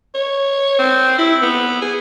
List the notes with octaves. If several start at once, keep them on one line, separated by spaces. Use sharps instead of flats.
C#5
C4
E4
B3
G#4